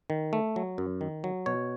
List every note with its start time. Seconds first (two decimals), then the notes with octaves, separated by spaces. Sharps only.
0.10 D#3
0.33 A3
0.56 F#3
0.78 F#2
1.01 D#3
1.24 F#3
1.46 B2 C#5